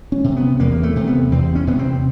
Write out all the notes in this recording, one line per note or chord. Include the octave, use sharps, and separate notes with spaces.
C#4
C3
B3
E2 A#3
A3
C3
B3
E2 C4
C#4
C3 B3
C4